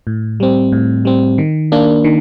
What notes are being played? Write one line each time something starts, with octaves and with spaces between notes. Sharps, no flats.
A2
G3 C4
A2
G3 C4
D#3
A#3 D4
D#3